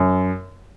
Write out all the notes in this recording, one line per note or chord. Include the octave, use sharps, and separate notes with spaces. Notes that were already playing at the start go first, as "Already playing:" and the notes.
Already playing: F#2